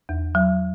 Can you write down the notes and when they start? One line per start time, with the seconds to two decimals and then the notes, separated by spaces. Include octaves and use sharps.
0.09 E2
0.35 F#3